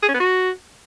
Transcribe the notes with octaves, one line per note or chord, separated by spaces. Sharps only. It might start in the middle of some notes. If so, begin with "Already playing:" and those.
G#4
C#4
B3
F#4